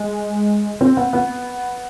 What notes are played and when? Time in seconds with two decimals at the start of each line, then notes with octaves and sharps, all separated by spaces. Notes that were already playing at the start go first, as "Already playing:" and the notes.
Already playing: G#3
0.81 C4
0.97 B3
1.13 B3